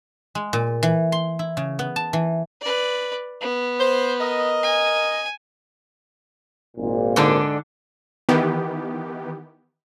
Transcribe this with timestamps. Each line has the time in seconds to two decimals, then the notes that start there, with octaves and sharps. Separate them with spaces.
0.35 G#3
0.53 A#2
0.83 E3
1.12 C6
1.39 E4
1.57 C#3
1.79 B3
1.96 A5
2.13 E3
2.61 B4 D5
3.41 B3
3.80 C5
4.20 A#4 D#5
4.63 G#5
6.77 G#1 A#2
7.16 G#2 D3 D4
8.29 D#3 E3 B3 G4